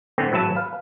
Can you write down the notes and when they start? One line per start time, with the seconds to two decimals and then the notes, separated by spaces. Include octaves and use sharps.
0.18 A2 D3 A3 B3 C4
0.31 G#1 A2 F#3 B4 E5 A5
0.56 B4 F5